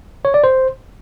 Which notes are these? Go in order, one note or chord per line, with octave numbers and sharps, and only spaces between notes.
C#5
D5
C5